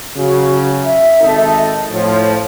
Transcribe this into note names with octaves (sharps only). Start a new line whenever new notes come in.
C#3 F#3 F#4
E5
G#1 D#4 A4
A2 F3 C#5